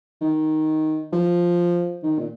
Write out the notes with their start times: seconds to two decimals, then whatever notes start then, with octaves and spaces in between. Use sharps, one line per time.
0.21 D#3
1.13 F3
2.03 D#3
2.18 A#2